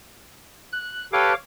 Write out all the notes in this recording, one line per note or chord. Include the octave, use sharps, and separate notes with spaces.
F#6
G4 A4 B4 C#5 F5 D6